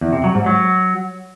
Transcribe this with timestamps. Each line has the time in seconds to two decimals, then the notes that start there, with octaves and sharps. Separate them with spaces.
0.01 E2
0.13 C3
0.24 F#3
0.35 G#2
0.46 F#3